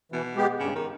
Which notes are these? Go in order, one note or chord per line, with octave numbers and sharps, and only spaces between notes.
B2 E3
G#3 B3 G4
G2 C#3
D#3